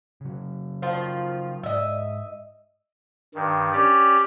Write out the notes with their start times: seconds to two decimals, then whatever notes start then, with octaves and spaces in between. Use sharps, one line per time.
0.21 C#3 F#3
0.82 D#3 F3 F4
1.63 G#2 D#5 E5
3.35 G2 D#3
3.72 C#4 G4 D5